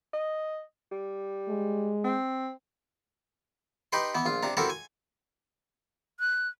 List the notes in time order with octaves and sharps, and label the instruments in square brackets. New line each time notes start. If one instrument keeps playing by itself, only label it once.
[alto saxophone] D#5
G3
[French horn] G#3
[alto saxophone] C4
[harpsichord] D#4 G4 B4 G5 C6
E3 B3
A#1 F4
C3 D4 A#5
C4 E4 F#4 G4 A4 A#4
G#5
[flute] F#6